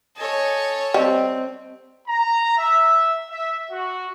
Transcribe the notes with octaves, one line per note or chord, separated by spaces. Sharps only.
A4 C#5 D#5 G#5
G3 C4 D#5
A#5
E5
E5
F#4